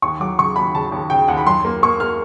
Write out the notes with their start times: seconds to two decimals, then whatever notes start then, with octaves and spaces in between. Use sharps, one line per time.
0.02 D#2 C#6
0.20 F#3 D6
0.38 C#3 C#6
0.56 D#2 B5
0.74 C#3 A5
0.92 D#2
1.10 C#3 G5
1.28 D#2 F#5
1.37 B5
1.46 F#2 C6
1.65 A#3
1.83 A#3 C#6
2.00 A#3 F6